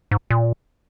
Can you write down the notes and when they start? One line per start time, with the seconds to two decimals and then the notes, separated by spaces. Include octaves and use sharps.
0.11 G#2
0.30 A#2